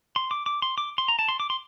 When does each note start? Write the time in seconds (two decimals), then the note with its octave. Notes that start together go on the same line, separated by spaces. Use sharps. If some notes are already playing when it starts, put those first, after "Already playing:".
0.16 C6
0.31 D6
0.46 D6
0.62 C6
0.78 D6
0.98 C6
1.08 A#5
1.19 A5
1.29 C6
1.40 D6
1.50 C6